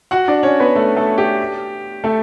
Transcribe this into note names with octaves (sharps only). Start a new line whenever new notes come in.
F#4 F#5
D4 D5
C#4 C#5
B3 B4
A3 A4
A3 A4
G4
A3 A4